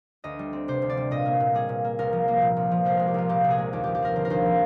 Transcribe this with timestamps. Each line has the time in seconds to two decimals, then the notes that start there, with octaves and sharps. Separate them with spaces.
0.24 D2 D#5
0.39 G3
0.53 C4
0.68 C3 C5
0.82 D2
0.89 D5
0.97 G3
1.11 A#2 D#5
1.25 A#3
1.40 A#2
1.55 G3 G#4
1.69 A#2
1.84 A#3
1.99 C2 A#4
2.13 F3
2.28 A#3
2.41 A#2
2.57 C2
2.71 F3
2.85 C2 C5
2.97 G#3 A#4
3.08 G4
3.14 C2 F4
3.29 A#2 G4
3.44 C2
3.50 G#4
3.58 G#3
3.73 D#2 G4
3.84 F3 G4
3.95 G4
4.02 C4 A#4
4.16 D3 C5
4.25 A#4
4.30 D#2 C5
4.45 F3